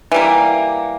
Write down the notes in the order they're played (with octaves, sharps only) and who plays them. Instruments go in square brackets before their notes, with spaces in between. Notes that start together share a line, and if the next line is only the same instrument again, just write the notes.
[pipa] E3 G3 A#3